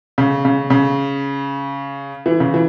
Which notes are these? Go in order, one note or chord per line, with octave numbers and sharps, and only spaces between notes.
C#3
C#3
C#3
E3
C#3
E3